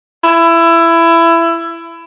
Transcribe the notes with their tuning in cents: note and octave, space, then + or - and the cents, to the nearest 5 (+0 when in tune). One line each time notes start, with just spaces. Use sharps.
E4 +20